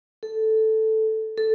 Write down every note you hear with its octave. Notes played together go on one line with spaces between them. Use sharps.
A4
A4